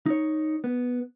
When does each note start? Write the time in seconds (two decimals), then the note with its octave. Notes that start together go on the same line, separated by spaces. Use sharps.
0.06 D#4 C#5
0.64 B3